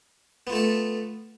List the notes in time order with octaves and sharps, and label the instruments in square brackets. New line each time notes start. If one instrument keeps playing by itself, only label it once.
[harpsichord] B3
F4
A3
A4